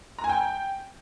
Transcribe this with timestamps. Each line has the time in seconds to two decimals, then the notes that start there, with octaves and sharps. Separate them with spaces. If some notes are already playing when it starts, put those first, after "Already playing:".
0.19 A#5
0.24 G#5
0.29 G5